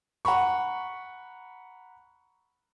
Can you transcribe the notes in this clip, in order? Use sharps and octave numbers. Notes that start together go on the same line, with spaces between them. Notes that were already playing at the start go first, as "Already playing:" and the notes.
F#5 A#5 B5 C#6